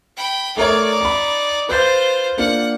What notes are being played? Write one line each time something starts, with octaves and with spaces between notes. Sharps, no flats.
G5 B5
A3 D#4 A#4 C#5 D5
A#5 B5
F4 B4 C5 G6 A6
A#3 D4 F4 F#5